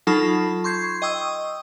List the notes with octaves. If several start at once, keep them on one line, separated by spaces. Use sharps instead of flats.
F#3 D#4 F4 A4 A5 B5
C6 C#6 G6 G#6 C7
D#5 G5 C#6 D#6 E6